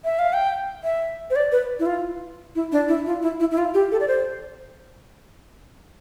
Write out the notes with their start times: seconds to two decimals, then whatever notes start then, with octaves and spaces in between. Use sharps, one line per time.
0.05 E5
0.19 F5
0.33 G5
0.84 E5
1.30 C5
1.36 D5
1.52 B4
1.79 E4
1.86 F4
2.55 E4
2.72 D4
2.88 E4
3.06 F4
3.22 E4
3.40 E4
3.51 E4
3.58 F4
3.74 G4
3.92 A4
4.00 D5
4.08 C5